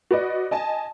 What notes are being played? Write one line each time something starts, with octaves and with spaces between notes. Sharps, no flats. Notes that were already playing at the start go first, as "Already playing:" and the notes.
F#4 B4 D5 D#5
D#5 G#5 A5